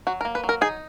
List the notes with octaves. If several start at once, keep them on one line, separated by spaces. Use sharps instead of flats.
F#3 F#4
A#4
A#3
B4
F#3
A#4
D#4 G#4